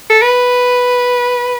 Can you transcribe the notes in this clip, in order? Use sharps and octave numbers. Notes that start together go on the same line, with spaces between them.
A4
B4